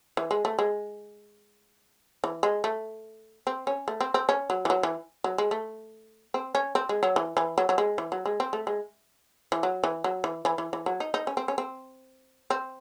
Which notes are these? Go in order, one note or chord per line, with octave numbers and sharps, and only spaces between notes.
E3
G#3
A3
G#3
E3
G#3
A3
C4
C#4
A3
C4
C4
C#4
F#3
E3
F#3
E3
F#3
G#3
A3
C4
C#4
C4
G#3
F#3
E3
E3
F#3
F#3
G#3
E3
F#3
G#3
C4
A3
G#3
E3
F#3
E3
F#3
E3
E3
E3
E3
F#3
D#4
D#4
C#4
C4
C#4
C4
C4